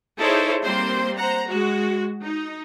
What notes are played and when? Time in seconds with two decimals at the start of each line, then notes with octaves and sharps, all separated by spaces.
0.17 D#4 E4 G#4 A4 C5 C#5
0.62 G3 A#3 C4 C5 C6
1.16 C5 F#5 A#5
1.47 G#3 F#4
2.23 D#4